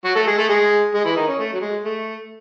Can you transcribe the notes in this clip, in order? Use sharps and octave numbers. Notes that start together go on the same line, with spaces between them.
F#3 F#4
A3 A4
G#3 G#4
A3 A4
G#3 G#4
G#3 G#4
E3 E4
D#3 D#4
C#4
A3
F#3
G#3
A3